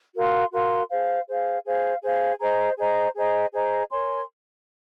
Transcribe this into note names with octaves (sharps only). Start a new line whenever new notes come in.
F#4 A#4 F5 C6
F#4 A#4 F5 C6
G#4 C5 F5
G#4 C5 F5
G#4 C5 F5
G#4 C5 F5
G#4 C5 D#5 A#5
G#4 C5 D#5 A#5
G#4 C5 D#5 A#5
G#4 C5 D#5 A#5
A#4 C#5 G#5 C6